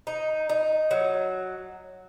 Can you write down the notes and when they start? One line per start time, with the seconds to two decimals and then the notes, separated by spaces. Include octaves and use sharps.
0.07 D#4
0.49 D#4
0.91 F#3